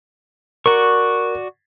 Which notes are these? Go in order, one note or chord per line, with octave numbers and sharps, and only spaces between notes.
F#4 A#4 D5 C#6